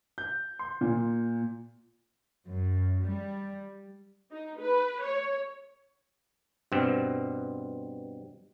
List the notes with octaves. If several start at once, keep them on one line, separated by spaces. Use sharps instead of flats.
G6
C6
A#2
F#2
G3
D#4
B4
C#5
G2 B2 C4